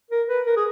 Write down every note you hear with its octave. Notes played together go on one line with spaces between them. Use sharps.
A#4
B4
A#4
G#4